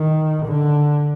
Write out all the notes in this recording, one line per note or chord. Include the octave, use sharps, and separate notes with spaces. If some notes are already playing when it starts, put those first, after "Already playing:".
Already playing: D#3
D3